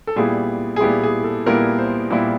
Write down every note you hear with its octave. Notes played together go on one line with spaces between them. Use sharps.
A4
A#2 G3 B3 E4 G#4
G#4
A#2 G3 B3 E4 G4
G#4
A4
A#2 G3 B3 E4 A#4
C5
A#2 G3 B3 E4